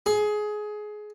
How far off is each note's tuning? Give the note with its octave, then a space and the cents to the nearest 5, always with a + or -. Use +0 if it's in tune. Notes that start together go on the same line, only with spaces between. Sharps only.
G#4 +20